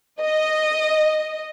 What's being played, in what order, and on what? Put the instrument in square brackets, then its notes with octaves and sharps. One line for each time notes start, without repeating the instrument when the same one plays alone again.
[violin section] D#5